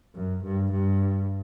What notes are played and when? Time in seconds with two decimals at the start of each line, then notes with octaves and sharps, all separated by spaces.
0.15 F#2
0.44 G2
0.72 G2